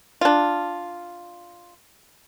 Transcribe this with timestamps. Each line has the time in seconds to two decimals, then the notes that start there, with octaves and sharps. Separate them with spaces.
0.21 D4 F4